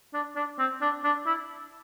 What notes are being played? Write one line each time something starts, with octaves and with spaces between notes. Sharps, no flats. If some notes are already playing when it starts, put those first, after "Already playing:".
D4
D4
C4
D4
D4
E4